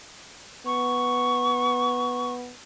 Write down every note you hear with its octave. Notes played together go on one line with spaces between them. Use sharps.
B3 C#6